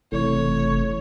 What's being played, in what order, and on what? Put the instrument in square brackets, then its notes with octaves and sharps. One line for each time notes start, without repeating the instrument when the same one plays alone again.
[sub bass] F#1 [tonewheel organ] C3 E3 A3 [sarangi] C#5